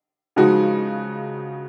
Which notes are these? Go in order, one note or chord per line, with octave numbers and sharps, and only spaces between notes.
C#3 F3 G#3 D#4 F#4